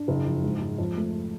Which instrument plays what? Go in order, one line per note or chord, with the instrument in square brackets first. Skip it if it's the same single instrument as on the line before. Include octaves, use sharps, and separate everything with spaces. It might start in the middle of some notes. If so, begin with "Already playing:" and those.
Already playing: [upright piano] D4
F#1
F2
G#2
G#3
F2
A3